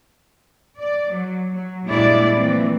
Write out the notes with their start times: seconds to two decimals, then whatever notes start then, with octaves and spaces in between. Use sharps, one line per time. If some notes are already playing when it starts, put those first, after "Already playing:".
0.80 D5
1.12 F#3
1.53 F#3
1.85 A#2 G3 G#3 D4 E4 D5
2.37 E3 F3 A3 A#3 C4